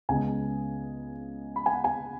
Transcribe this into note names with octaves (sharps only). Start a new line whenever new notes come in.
C#2 C#3 G#3 B3 G#5
B5
G#5
F#5
G#5